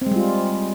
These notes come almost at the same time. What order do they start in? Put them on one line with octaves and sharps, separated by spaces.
C4 G#3 G3 F4